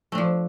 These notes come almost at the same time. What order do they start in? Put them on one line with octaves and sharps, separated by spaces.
A3 D4 F3